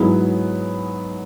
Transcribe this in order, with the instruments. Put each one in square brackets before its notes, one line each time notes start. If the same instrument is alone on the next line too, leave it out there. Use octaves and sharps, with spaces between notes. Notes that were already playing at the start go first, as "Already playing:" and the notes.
Already playing: [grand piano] G#2 F#3 B3 E4 G#4